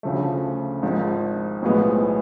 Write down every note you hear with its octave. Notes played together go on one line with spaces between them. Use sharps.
D2 C#3 F3 A3
G#1 G#2 F3
B1 A2 F3 G#3 B3